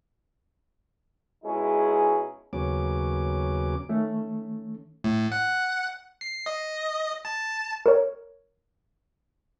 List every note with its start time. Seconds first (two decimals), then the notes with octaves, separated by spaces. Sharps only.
1.43 B2 G#3 C#4 D#4 E4 G#4
2.53 D#2 C#3 F#3 B3 C#4 D6
3.89 D#3 A3 C#4
5.04 A2
5.32 F#5
6.21 C7
6.46 D#5
7.25 A5
7.86 A#4 C#5